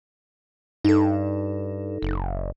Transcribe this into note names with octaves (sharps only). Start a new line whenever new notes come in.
G2 D#4 A4
F#1